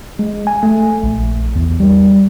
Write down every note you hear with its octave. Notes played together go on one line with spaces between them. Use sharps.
G#3
G#5
A3
A#1
E2
G3